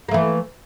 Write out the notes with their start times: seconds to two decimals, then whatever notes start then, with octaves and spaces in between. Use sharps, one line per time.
0.09 A#3
0.11 A3
0.14 E3